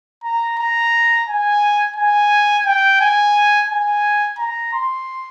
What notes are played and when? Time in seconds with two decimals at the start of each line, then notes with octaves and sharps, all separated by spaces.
0.24 A#5
0.58 A#5
1.27 G#5
1.96 G#5
2.66 G5
3.01 G#5
3.69 G#5
4.38 A#5
4.73 C6